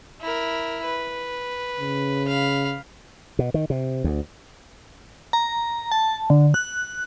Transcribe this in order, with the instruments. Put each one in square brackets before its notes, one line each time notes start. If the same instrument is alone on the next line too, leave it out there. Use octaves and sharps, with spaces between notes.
[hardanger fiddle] E4 A#4
B4
[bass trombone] C#3
[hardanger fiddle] F5 B5
[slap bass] B2
D#3
C3
D2
[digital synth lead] A#5
A5
D3
F#6